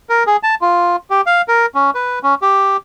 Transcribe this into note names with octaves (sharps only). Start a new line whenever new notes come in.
A#4
G#4
A5
F4
G4
F5
A#4
C#4
B4
C#4
G4